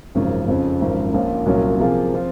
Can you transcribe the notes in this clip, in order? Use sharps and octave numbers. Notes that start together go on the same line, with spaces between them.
G#1 F#2 C#3 F3
F2 C#3 F3
G#1 F#2 F3
A#1 A#2 F3 A#3 C#4
C2 A#2 F#3 A#3 C#4
C3 F3 A#3 F4 G#4
F3 C4 F4